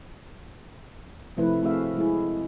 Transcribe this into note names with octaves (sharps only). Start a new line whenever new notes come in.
C3 F3 A3 E4 B4
A3 C4 F#4 G#4 E5 F5
G#3 E4 G#4